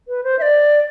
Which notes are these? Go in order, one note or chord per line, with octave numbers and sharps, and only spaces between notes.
B4
C5
E5
D5